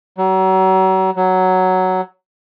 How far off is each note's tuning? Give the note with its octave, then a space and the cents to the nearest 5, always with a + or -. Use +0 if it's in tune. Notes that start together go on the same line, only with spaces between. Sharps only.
F#3 +35
F#3 +5